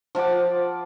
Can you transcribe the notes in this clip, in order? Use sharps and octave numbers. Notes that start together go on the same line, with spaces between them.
F3 F4 F#5 D6